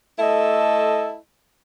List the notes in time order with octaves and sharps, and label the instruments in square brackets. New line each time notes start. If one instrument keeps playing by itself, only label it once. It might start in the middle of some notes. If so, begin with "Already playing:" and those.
[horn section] A3 E4 A4 D#5